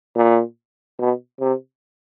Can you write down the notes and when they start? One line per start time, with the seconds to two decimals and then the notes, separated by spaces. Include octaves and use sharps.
0.16 A#2
0.99 B2
1.40 C3